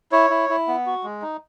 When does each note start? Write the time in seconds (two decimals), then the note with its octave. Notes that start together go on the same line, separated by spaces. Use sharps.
0.12 E4 C#5
0.30 E4
0.49 E4
0.68 B3
0.86 F#4
1.04 G#3
1.22 D#4